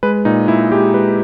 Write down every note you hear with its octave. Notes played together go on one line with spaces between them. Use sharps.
G#3 B4
A#2 D#4
A#2 E4
G#3 G4
G#3 B4